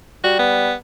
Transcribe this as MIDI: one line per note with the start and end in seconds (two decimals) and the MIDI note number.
0.24 0.71 55
0.24 0.36 66
0.39 0.74 59